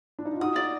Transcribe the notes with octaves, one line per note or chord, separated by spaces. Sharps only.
D4
D#4
F4
D#4 F#4 D#6
D5